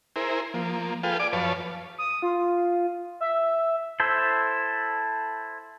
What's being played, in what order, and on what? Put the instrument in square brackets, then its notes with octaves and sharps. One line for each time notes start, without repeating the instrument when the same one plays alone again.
[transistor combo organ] E4 G#4 A#4 C5
F3 A#3
F4 G#4 A4 B4 F5 G5
G#4 D5 D6
F#2 F3 B4 C#5 F5 A5
[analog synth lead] D#6
F4
E5
[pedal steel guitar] E4 A4 C5